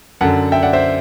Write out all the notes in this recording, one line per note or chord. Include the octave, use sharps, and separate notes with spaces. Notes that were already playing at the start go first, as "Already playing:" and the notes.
F#2 D3 F#5 A5
E5 G5
D5 F#5
C5 E5